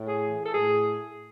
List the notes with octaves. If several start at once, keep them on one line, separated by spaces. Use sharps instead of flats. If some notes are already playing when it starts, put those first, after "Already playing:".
Already playing: A2
G#4
E3
A4
A2 G#4